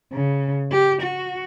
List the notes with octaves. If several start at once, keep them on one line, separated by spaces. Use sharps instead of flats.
C#3
G4
F#4